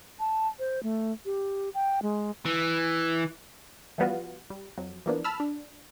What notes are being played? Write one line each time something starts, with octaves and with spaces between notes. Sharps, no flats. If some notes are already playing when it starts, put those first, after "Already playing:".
A5
C5
A3
G4
G5
G#3
E3
E3 F3 G3 B3 F4 F#4
G3
F2 F#3
E3 F3 A#3 B3 D4
A5 B5 E6 F6
D4